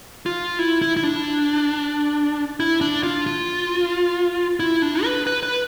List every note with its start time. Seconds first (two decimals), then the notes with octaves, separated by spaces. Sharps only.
0.26 F4
0.59 E4
0.82 E4
0.97 E4
1.03 D4
2.60 E4
2.81 D4
3.03 F4
3.27 F4
4.60 E4
4.82 D4
5.04 B4
5.27 B4
5.43 B4